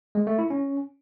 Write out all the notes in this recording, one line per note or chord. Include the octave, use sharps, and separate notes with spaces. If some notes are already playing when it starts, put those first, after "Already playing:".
G#3
A3
E4
C#4